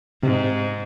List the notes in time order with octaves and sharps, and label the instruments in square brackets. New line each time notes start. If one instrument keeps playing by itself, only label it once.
[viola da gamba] G#2 [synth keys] C3